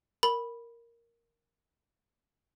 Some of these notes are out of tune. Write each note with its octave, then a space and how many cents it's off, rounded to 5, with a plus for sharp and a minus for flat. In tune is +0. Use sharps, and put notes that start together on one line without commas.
A#4 +0 B5 -10